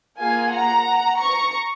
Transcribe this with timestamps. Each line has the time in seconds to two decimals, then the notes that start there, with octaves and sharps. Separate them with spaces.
0.19 A#3 F4 G#4 F5 G#5
0.52 F#5 A#5
1.19 A#5 C#6